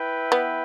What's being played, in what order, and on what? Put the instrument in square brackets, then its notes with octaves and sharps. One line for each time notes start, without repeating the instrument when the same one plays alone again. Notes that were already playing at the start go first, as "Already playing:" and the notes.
Already playing: [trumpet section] E4 B4 E5 G5
[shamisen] B3